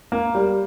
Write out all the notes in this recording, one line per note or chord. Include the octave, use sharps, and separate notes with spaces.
A#3
G3